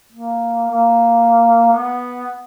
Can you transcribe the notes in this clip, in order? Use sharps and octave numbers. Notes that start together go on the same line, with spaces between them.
A#3
A#3
B3